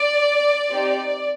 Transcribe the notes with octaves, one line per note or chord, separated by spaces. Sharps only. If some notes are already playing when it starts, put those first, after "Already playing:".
Already playing: D5
C4 D#4 G4